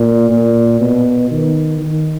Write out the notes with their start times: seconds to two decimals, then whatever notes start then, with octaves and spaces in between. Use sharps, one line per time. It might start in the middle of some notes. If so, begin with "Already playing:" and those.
Already playing: A#2
0.31 A#2
0.81 B2
1.31 D#3
1.81 D#3